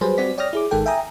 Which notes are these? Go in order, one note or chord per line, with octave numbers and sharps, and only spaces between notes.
F#3 G3 G#4 B4 C5
G3 C4 F#4 D5 B6
C#5 D5 G5 D#6 F6 A#6
E4 G#4 D6
G#1 D#3 G#3 A4 G5
E5 G5 G#5 A#5 D#6